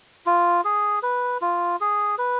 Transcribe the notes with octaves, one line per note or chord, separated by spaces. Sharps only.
F4
G#4
B4
F4
G#4
B4